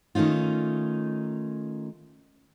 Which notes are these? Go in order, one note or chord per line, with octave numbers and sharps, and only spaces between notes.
D#3 A3 C#4 D#4 F4